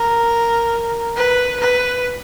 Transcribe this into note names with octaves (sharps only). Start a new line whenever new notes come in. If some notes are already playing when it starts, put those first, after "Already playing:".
Already playing: A#4
B4
B4